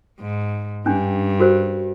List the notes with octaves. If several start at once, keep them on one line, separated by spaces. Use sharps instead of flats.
G#2
G2 C#4 D4
F#4 A#4 C5